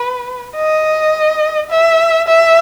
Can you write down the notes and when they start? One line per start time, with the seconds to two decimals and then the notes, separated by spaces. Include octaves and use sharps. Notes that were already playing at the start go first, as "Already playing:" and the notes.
Already playing: B4
0.57 D#5
1.71 E5
2.28 E5